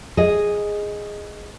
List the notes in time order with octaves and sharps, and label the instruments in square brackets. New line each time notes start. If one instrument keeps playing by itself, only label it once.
[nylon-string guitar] G#4 D#5